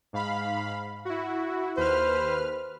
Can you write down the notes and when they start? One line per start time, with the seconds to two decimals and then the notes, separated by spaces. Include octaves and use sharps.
0.13 G#2 F5 B5
1.05 E4 F#4
1.77 D#2 B4 C5 F6